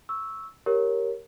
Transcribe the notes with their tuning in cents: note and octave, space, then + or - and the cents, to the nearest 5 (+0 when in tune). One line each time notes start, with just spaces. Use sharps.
C#6 +0 E6 -5
G4 +0 A#4 +0 C#5 -5